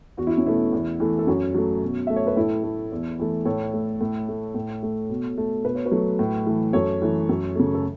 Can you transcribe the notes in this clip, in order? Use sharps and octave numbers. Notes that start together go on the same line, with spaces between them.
E2 F#4
E4
C#4
B2 A3 B3 E4
E2
E3 A3
A4
F#2 C#4 F#4
F#3 A3
B2
A3 E5
C#5
B4
A2 E4 A4
A3
E2
E3 A3
A2 A4 C#5
A3
A2
A3
A2
A3
B2
A3
B2 B4
C#5
F#4 B4
F#3 A3
A2
E3 A3
F#2 A4 C#5
E3 A3
F#2
C#3 A3
A4